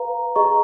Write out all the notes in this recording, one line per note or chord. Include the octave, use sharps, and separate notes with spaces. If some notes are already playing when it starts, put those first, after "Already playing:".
Already playing: B4 F5 A#5
G#4 D#5 A#5 C#6